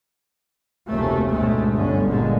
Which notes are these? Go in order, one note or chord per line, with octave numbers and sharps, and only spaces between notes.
F1 D2 C3 A3 A#3 C#4
D2 G#2 B2 G#3 A3
G1 D3 C#4
A#2 D3 G#3 A#3